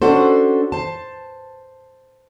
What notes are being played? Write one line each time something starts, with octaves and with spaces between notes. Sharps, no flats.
C#4 D4 F#4 A4 C5
C5 A5